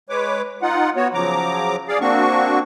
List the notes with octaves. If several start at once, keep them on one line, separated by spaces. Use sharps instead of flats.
G#3 B4 C#5 D6
D#4 F4 F#5
B3 F#4 C#5
C#3 F3 F#3 A#5 D6
G#4 D5 F5
A#3 C4 D4 F#4 C#6